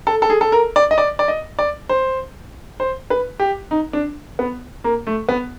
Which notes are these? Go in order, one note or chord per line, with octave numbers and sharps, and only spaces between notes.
A4
A4
G#4
A4
A#4
D5
D#5
D5
D5
D#5
D5
C5
C5
B4
G4
D#4
D4
B3
A#3
A3
B3